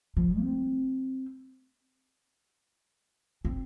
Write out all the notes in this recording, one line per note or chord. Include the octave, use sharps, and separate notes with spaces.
F3
C4
C4